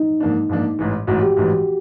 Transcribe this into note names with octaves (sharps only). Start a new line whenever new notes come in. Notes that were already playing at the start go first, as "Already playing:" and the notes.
Already playing: D#4
G#2 F3 A#3 D4
G#2 F3 A#3 D4
A1 G#2 E3
A1 G#2 E3 F#4
G4
A1 G#2 E3